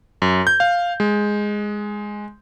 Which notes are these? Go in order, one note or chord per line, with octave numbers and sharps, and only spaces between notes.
F#2
G6
F5
G#3